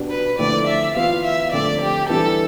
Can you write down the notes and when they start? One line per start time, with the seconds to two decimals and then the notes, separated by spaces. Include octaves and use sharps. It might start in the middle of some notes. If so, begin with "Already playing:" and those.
Already playing: B2 B3 D4 G4
0.10 B4
0.39 F2 D3 A3 C4 E4 D5
0.67 E5
0.96 E3 B3 F4 F5
1.24 E5
1.53 F2 D3 A3 D5
1.81 G4
2.09 E3 G3 B3 D4 A4